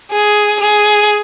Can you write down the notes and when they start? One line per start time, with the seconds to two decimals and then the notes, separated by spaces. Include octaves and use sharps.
0.12 G#4
0.60 G#4